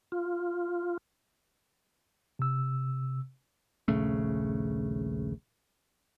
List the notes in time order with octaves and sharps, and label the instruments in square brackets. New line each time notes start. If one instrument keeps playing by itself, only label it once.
[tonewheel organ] F4
[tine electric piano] C3 E6
[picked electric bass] D#1 A#1 C#3 A3